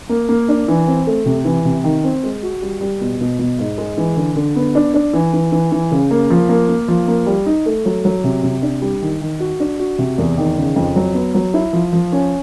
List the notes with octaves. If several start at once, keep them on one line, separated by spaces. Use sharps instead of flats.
A#3
A#3
D4
E3
C4
A3
C3
E3
C3
D#3
C4
G#3
F#4
G3
G3
B2
B2
B2
G#2
G#3
E3
D3
D3
B3
D4
D4
E3
E3
E3
E3
C#3
A#3
F3
A#3
A#3
F3
A#3
G3
D#4
A3
F#3
F#3
C3
C3
D4
G3
D#3
D#3
F#4
D4
F#4
C3
E2
D#3
C#3
F2
F#3
B3
F#3
E4
F3
F3
C#4